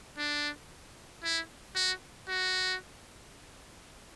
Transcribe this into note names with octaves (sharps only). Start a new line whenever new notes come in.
D4
E4
F#4
F#4